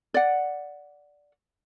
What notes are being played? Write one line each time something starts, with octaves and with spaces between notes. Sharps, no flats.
D5 F#5